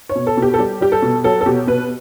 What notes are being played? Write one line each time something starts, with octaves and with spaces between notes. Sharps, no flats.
C#5
B2
A4
B2 G4
A4
G3 G4
G3 G4
A4
B2
F#3 A4
A4
B2 G4
B2 B4